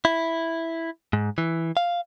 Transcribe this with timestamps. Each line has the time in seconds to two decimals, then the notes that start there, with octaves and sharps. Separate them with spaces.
0.05 E4
1.13 G#2
1.38 E3
1.77 F5